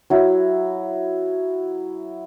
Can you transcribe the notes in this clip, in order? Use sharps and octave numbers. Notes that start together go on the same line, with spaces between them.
F#3 E4